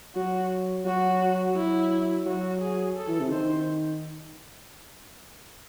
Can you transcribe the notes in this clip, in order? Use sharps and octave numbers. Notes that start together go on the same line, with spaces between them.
F#3 F#4
F#3 F#4
F#3 E4
F#3 F#4
G#4
A4
E3
C3
D#3 C5